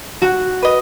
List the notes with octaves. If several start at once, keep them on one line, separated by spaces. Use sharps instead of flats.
F#4
B4 D#5